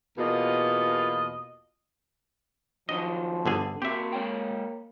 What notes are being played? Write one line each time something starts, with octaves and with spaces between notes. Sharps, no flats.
E2 B2 A#3 F4 D#5
D#3 F3 F#3 D4 D#5
G1 D3 G#4
A#3 C4 F#4 G4 E5
G#3 C#5 G5